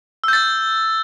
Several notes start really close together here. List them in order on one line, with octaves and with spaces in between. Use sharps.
E6 G6 A6